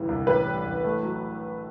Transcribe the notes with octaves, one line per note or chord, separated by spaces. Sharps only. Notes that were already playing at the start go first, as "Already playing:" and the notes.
Already playing: G1 E3 G3
C2
A1 B4
G3
A1
A3
F#3